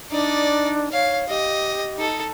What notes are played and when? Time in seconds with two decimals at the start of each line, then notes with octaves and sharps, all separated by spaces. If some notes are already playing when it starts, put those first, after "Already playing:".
0.11 D4 D#4 D5
0.92 C#5 F5
1.29 G4 D#5
1.97 D#4 A4